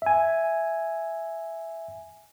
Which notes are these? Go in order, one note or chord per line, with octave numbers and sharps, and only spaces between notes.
E5 G#5